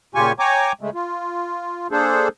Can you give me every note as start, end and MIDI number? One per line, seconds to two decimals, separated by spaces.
0.15 0.32 46
0.15 0.32 49
0.15 0.32 65
0.15 0.32 67
0.15 0.32 80
0.15 0.32 85
0.39 0.72 73
0.39 0.72 79
0.39 0.72 80
0.39 0.72 82
0.39 0.72 85
0.39 0.72 86
0.81 0.90 49
0.81 0.90 56
0.81 0.90 57
0.94 1.88 65
1.91 2.28 58
1.91 2.28 62
1.91 2.28 68
1.91 2.28 69
1.91 2.28 72